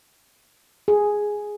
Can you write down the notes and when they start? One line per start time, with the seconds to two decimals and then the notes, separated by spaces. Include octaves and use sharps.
0.88 G#4